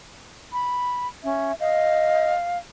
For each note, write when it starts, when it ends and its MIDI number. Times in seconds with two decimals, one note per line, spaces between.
0.53 1.07 83
1.24 1.52 61
1.24 1.55 76
1.60 2.32 75
1.60 2.58 77